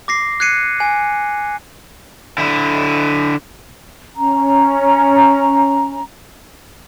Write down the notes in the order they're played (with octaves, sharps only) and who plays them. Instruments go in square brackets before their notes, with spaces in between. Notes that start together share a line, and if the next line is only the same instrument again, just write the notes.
[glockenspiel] D6 A#6 C7
F#6 G#6 C7 C#7 D#7
G#5
[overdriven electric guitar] D3 E4
[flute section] C#4 A#5